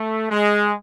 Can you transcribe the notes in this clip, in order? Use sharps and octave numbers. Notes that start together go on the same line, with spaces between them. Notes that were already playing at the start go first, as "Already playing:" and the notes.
Already playing: A3
G#3